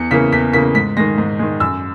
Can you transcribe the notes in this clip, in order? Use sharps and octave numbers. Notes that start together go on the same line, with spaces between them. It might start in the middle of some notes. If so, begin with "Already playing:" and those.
Already playing: E2 C#7
C#3 E3 A#3 B6
E2 B6
C#3 E3 A#3 B6
G#2 B6
D#3 G#3 A#6
G#2
D#3 G#3
F#2 E6